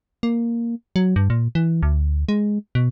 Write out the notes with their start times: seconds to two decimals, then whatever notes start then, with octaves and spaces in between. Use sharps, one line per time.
0.23 A#3
0.96 F#3
1.16 G2
1.30 A#2
1.55 E3
1.83 D2
2.29 G#3
2.75 B2